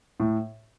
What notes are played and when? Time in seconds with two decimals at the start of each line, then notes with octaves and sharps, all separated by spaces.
0.20 A2